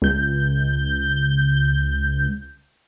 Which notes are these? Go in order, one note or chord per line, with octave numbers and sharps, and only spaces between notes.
C#2 G6